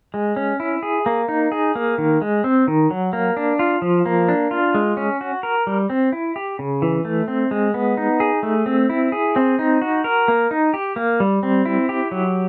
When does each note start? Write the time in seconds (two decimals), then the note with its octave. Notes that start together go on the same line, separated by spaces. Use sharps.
0.14 G#3
0.36 C#4
0.60 E4
0.83 G#4
1.06 A#3
1.29 D#4
1.52 G#4
1.75 A#3
1.98 D#3
2.22 G#3
2.44 C4
2.68 D#3
2.91 F#3
3.13 A#3
3.37 D4
3.59 F4
3.82 F3
4.06 A#3
4.29 D4
4.51 F4
4.74 G#3
4.97 C#4
5.21 F#4
5.43 A#4
5.67 G3
5.90 C4
6.12 E4
6.36 G4
6.59 C#3
6.82 E3
7.05 A3
7.28 C4
7.51 G#3
7.74 B3
7.97 D#4
8.20 G#4
8.43 A3
8.66 C4
8.89 E4
9.12 G#4
9.36 C4
9.59 D#4
9.82 F#4
10.04 A#4
10.28 A#3
10.51 D#4
10.74 G4
10.96 A#3
11.20 G3
11.43 C4
11.65 E4
11.89 G4
12.12 F#3